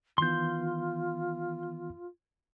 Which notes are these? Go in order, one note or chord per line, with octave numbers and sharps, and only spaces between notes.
D#3 E3 B3 F4 C6 G6